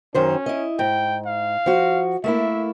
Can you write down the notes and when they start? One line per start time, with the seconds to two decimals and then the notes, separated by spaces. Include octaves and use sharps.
0.15 F#2 D#3 C#4 C5
0.46 E4 D#5
0.79 G#2 G5
1.26 F5
1.66 F3 F#4
2.24 A3 A#3 E4 E5